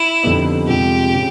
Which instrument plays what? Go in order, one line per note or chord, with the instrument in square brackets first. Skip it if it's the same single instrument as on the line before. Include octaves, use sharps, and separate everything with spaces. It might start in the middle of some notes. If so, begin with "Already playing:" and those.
Already playing: [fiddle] E4
[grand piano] F2 D3 G3 B3 D#4
[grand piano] F2 C3 F3 G#3 [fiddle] G4
[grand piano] C#3